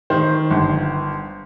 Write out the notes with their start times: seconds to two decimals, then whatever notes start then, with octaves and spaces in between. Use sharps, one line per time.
0.10 D#3 C5
0.51 G1